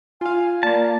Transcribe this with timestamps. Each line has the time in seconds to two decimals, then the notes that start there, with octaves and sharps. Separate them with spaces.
0.21 F4 F5 G#5
0.63 A#3 D5 A5